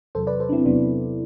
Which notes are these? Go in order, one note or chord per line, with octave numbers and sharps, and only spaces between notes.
E2 C3 F#3 A4 C5
B4 D5
A4 C5
D4
C4 E4
E2 C3 F#3 B3 D4